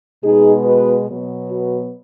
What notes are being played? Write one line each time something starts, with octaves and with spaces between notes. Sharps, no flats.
B2 G#3 B3 D#4 G#4
F#4 B4
B2 F#3 B3
F#4 B4